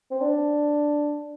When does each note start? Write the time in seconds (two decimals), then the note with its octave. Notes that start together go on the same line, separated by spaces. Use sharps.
0.11 C4
0.21 D4